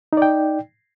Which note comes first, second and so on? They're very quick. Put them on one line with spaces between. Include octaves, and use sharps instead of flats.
D#4 D5 G5